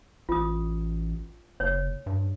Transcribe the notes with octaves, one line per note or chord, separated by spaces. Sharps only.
A1 F4 D#6
F#1 C#5
G2